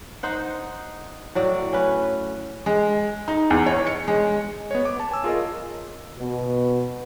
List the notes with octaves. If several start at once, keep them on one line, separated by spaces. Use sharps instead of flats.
D#4 C5 F#5
A2 F#3 D5
C#4 B4
G#3
D#4
E2
C#5
C#7
G#3
B3 C#5
D6
A5
G#5 E6
F4 G#4 A#4 C#5 D#5
B2